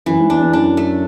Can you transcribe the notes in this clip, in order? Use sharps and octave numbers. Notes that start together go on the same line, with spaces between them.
F#2 E3
G#2
E2 D4
E2
F#2 D4
A3